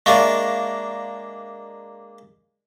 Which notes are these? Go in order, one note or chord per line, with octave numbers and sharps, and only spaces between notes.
G#3 A#3 D4 E5 F5 C#6